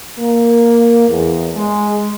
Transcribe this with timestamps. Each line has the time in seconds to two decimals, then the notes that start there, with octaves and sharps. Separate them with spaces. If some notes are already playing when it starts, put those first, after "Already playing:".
0.19 A#3
1.09 E2
1.55 G#3